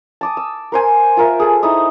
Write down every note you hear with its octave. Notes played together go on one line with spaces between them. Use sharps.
A5 D6 D#6
E6
A#4 C5 G#5
F4 A#4 E5
G#4 A4 E5
D#4 E4 E5 D#6